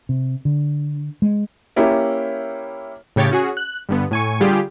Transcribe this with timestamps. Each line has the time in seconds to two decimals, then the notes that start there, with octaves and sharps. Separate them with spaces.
0.09 C3
0.45 D3
1.22 G#3
1.76 A#3 C#4 E4 G4
3.16 A2 C#3 G4 C#5 G5 A6
3.31 C#4 F#4 G#4
3.57 F#6
3.89 G2 D3 B3
4.11 A2 G#5 C#6
4.40 D3 G3 F4 G4 G#4